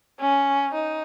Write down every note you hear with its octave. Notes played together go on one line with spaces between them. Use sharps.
C#4
D#4